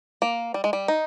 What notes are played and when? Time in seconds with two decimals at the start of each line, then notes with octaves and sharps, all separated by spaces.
0.22 A#3
0.54 G3
0.64 G#3
0.73 G3
0.88 D#4